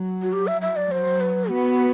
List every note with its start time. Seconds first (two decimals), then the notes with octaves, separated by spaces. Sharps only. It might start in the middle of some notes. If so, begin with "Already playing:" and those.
Already playing: F#3
0.22 F#4
0.33 G4
0.47 E5
0.62 E5
0.76 D5
0.91 F#3 C5
1.21 B4
1.50 B3 F#4